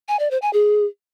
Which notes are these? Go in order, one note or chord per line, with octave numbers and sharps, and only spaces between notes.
G#5
D5
C5
G#5
G#4